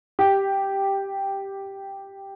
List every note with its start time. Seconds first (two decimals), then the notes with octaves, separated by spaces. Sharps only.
0.19 G4